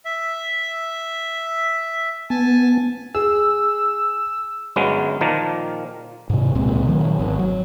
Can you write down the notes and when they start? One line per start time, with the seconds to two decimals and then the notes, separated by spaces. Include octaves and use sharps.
0.05 E5
2.30 B3 G#5 A5
3.15 G#4 E6
4.76 G1 F#3 G#3 C#4 B4
5.21 A#2 D#3 F3 A#3 A#4 A5
6.30 G#2 C3
6.55 C#2 A#2 G#3 C4
6.87 D#3 F#3 A3
7.19 G#1
7.39 F#3